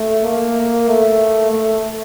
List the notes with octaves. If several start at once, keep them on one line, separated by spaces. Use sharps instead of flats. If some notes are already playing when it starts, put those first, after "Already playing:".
Already playing: A3
A#3
A3
A3